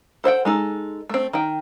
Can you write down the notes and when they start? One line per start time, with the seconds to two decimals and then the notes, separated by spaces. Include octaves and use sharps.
0.24 A4 C5 F#5 G5
0.45 G#3 D#4 A4
1.09 A3 C4
1.33 D#3 G5